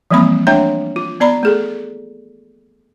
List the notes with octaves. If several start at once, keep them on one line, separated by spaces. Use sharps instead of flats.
E3 F3 G3 A#3 C4 B5
A3 D4 C#5 E5 G5 A#5
F4
B3 D5 A#5 B5
A3 G#4 A4